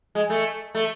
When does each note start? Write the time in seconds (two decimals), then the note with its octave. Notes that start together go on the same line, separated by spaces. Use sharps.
0.15 G#3
0.30 A3
0.75 A3